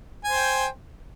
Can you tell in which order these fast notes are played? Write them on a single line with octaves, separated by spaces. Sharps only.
G#5 C5 G5